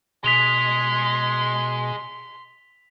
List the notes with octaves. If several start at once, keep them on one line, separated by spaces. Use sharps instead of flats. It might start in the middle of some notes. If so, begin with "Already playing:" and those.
B2 G#3 G#4 C6 B6 F7 G7